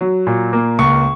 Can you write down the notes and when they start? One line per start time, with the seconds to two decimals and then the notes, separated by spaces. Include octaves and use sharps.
0.01 F#3
0.27 A#2
0.53 A#3
0.79 C#2 C#6